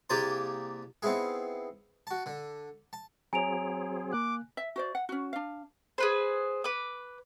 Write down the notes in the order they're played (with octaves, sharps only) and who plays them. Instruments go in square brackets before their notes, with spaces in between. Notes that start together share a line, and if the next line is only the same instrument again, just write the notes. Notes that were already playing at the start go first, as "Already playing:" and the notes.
[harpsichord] C2 A#3 G4 G#4 A5 C6
B3 C4 D#4 E4 G#4
F#4 A5
D3
A5
[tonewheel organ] F#3 C4 G#4 [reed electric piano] C#5 A#5 [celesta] G#5 D7 F7
[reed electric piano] A#3 F#6 [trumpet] D6
[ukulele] E5
F#4 C5 D5
F#5
C#4 F#4
D4 F5
[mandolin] G#4 B4 C5
B4 D6